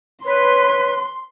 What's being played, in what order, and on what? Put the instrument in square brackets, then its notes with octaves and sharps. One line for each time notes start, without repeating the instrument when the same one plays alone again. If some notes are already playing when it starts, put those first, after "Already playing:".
[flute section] B4 [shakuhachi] C#5 [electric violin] C6